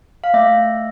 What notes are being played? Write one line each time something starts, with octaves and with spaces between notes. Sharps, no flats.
F5
A3 E5